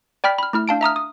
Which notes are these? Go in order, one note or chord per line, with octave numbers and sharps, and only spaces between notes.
D5 G5 B5 F6 B6
B5 F6
A3 E4 F6
D4 F5 A5 D7
E5 A#5 D#6 F6
D#6